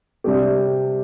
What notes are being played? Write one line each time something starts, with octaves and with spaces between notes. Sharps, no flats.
C3 G3 D4 G4